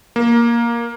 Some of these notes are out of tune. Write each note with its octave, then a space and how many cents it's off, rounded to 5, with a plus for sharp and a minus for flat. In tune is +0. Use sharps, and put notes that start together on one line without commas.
A#3 +10